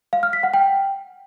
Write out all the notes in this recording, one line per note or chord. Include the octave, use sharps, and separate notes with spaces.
F5
F6
B6
F#5
G5